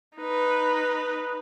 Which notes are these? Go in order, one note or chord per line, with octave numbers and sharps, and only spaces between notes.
D#4 B4